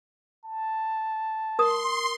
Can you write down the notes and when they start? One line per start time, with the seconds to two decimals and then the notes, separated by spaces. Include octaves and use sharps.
0.45 A5
1.59 A#4 C6 D#6